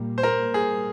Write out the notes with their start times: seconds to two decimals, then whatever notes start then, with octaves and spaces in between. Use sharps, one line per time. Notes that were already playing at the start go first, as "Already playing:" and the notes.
Already playing: A#2 G3 A#3
0.18 C5
0.23 A#4
0.54 G#4